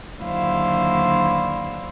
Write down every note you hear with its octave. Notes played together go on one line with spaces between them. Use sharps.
D#2 D3 F#3 E4 C5 F5